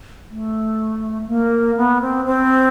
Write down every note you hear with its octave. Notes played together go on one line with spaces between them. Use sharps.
A3
A#3
B3
C4
C4